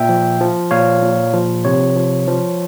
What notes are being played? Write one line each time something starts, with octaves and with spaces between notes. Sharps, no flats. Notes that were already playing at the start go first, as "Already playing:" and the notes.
Already playing: A#2 E5 G5
F3
F3
A#2 C#5 F5
A#2
F3
C3 C#5
F3
F3